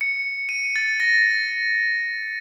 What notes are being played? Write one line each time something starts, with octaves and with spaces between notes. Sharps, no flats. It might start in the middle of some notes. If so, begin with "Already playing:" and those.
C#7
D#7
A6
A#6